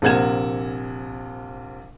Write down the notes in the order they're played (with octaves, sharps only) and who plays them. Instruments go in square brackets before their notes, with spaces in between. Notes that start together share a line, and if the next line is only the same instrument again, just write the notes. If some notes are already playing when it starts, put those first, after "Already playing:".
[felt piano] A#1 C3 A#4 F#5 G#6 E7